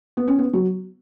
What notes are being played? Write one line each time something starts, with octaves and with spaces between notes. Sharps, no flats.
B3
C#4
B3
F#3